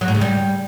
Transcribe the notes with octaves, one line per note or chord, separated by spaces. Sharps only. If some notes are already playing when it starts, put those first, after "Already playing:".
F#3
A2
C#3
G3